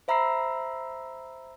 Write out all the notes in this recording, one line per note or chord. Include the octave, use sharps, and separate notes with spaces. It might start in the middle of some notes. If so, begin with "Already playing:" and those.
C5 E5 A#5 B5 E6 C7